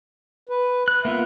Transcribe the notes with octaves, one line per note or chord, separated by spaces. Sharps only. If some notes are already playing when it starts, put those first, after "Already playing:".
B4
F#6
A#3 B3 F4 E5